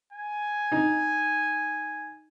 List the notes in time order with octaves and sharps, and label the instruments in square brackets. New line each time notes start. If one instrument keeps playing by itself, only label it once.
[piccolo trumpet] G#5
[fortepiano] D#4